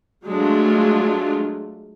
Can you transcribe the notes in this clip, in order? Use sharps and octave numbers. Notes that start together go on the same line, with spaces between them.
F#3 G#3 A3 D4 F4